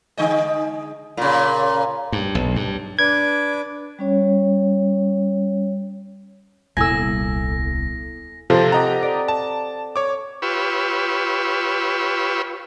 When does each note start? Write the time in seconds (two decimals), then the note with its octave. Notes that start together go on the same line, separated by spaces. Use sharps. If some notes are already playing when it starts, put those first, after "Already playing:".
0.17 D3 G#3 D#5
1.17 A#2 C#3
2.12 G2
2.35 B1
2.56 G2
2.99 D4 B4 D6 G#6
3.99 G3 C#4 C#5
6.77 D#1 C2 B3 E4 A4 G#5 E6 A#6
8.50 C3 F3 C4 F4 A4
8.72 G4 D#5 F#5 A#5
9.02 D5
9.28 A5
9.96 C#5 D6
10.42 F4 G4 B4 C#5 E6